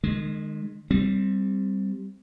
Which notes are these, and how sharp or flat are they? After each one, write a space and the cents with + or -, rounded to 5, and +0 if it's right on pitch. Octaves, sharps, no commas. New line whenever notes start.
D#3 -40 G#3 +0
G3 +0 C4 +0